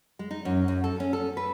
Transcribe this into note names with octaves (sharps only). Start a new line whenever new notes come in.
G#3
D#4
F#2
F#2
A4
C#4
A4
B4